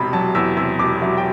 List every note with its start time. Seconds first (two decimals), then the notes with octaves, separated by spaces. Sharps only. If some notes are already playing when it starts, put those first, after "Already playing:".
Already playing: E1 C3 B5
0.13 F#3 A5
0.35 E2 E6
0.57 C3 E6
0.79 E1 D6
1.01 F#3 E5
1.18 G5